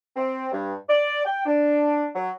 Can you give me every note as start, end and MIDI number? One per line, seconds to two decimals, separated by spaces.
0.16 0.48 60
0.52 0.75 43
0.89 1.24 74
1.25 1.44 79
1.46 2.08 62
2.15 2.30 54